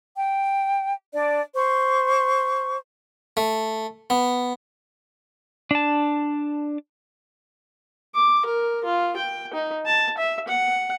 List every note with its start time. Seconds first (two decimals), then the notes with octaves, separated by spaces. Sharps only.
0.15 G5
1.13 D4 D5
1.54 C5 C#6
3.37 A3
4.10 B3
5.71 D4 A5
8.15 D6
8.45 A#4
8.84 F4
9.17 G5
9.54 D#4
9.86 A5
10.18 E5
10.48 F#5